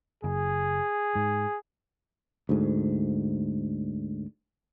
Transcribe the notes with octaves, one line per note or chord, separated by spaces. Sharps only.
F#1 G#4
G#2
D2 G#2